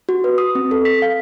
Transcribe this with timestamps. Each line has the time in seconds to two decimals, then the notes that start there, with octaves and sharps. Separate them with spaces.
0.09 F#4
0.24 B4
0.38 D#6
0.55 C4
0.71 A4
0.85 B6
1.02 F5